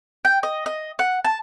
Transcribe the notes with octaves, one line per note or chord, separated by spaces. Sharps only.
G5
D#5
D#5
F#5
A5